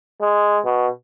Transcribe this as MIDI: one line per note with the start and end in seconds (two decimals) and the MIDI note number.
0.21 0.59 56
0.65 0.88 47